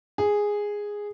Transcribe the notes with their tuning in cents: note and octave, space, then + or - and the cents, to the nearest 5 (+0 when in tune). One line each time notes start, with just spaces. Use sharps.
G#4 -5